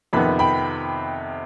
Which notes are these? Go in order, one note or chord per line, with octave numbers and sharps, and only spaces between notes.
F2 C3 D#3 B3 B5
G5 B5